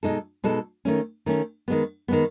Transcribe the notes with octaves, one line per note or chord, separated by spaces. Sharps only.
B2 G#3 D#4 A4
B2 G#3 D#4 A4
D#3 A3 C#4
D#3 A3 C#4
D#3 G#3 B3
D#3 G#3 B3